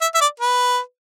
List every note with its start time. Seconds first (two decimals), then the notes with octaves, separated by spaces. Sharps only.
0.01 E5
0.15 E5
0.21 D5
0.40 B4